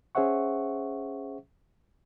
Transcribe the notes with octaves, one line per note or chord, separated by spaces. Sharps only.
C#4 G#4 C5 E5 F#5 C#6